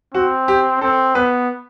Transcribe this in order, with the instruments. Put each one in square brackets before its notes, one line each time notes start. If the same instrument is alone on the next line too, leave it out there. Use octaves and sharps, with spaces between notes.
[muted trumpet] C4 [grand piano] F#4
[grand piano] G4
[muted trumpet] C4 [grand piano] A4
[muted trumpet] B3 [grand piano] B4